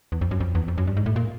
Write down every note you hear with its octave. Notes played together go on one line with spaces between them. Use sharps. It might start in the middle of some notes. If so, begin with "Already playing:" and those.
E2
F2
F#2
F2
E2
F2
F#2
G2
G#2
A2
A#2